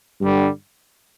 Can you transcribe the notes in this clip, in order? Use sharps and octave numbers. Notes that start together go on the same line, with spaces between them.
G2 D3 G3